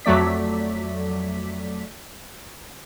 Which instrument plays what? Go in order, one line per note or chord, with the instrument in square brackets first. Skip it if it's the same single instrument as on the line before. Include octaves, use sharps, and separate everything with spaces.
[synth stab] F2 F#3 A3 D5 B6